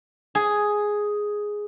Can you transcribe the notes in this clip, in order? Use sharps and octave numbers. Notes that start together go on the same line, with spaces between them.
G#4